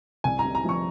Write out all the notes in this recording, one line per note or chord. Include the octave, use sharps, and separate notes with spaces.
C2 G#5
A#5
C3
A#5
F3 C#6